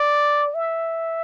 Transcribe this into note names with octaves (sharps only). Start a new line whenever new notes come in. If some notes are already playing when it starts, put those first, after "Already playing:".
Already playing: D5
E5